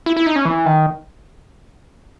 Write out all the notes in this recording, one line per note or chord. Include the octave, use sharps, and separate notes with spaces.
E4
E4
D#4
C#4
E3
D#3